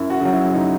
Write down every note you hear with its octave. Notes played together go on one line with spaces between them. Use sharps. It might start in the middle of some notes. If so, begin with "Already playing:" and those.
Already playing: F#2 E4
F#4
C#3 F#3
E4
D#4